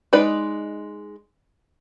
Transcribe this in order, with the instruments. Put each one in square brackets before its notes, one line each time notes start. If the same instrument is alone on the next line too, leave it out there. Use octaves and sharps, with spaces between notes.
[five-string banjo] G#3 D#4 B4 D5